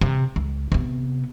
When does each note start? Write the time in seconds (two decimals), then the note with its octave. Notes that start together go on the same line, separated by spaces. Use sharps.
0.01 C3
0.36 C#2
0.72 C3 B3